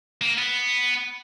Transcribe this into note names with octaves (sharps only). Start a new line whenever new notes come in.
A#3
B3